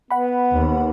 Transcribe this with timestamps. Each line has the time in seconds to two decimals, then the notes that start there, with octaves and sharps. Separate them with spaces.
0.11 B3 F#5 B5
0.51 D#2